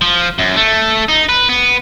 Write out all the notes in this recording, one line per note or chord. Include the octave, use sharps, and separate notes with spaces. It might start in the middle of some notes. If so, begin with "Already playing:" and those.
F3
F#2
A3
D#4
B4
B3